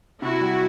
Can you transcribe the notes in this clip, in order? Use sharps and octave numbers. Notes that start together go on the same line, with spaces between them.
C3 E4 F#4
G3